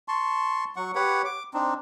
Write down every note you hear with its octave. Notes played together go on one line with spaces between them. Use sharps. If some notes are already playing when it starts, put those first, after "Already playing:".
A5 C6 C#6
F#3 F#5 C#6
G4 B4 C#5 F#5
D6
C4 D4 D#4